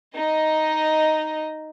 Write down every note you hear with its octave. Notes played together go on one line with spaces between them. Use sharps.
D#4 D#5